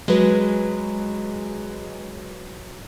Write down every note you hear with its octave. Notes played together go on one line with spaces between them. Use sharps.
F#3 G#3 B4